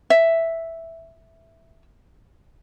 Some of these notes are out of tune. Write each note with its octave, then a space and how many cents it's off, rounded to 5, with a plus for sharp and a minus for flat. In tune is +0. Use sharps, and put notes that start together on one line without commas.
E5 +0